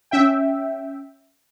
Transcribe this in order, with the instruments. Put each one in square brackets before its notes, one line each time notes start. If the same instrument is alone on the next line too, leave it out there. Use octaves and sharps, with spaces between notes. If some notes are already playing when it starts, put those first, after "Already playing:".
[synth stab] C#4 E5 G5